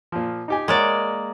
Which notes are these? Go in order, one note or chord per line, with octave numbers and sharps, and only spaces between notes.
A#2 F3
D#4 G4 G#5
G#3 A#3 A#4 C#5 D5 F#5